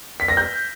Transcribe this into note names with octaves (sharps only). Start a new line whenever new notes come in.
B6
A#6
G6